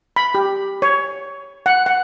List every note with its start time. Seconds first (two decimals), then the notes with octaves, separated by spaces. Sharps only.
0.16 B5
0.35 G4
0.82 C#5
1.66 F#5
1.86 F#5